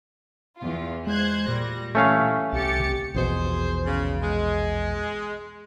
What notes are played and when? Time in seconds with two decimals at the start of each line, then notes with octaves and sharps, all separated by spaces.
0.59 E2 F4
1.07 G#3 C5 F#6 G#6
1.48 A#2 G3 A#6
1.95 E3 A3 C#4 F5
2.53 C2 G4 A6 C#7
3.14 A#1 E2 B2 G#4 C5
3.85 C#3
4.19 G#3